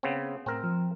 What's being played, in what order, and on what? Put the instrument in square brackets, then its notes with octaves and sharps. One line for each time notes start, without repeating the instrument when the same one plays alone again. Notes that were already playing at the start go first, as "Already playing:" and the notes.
[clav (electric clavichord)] C#3 B3 C4
[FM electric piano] A2 [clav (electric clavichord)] C4 A#4
[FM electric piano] F3